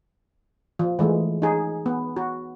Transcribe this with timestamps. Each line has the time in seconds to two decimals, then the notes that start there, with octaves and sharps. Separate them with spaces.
0.79 F3
0.99 E3 G#3 A3
1.42 D#4 G#4
1.86 B3
2.16 F#4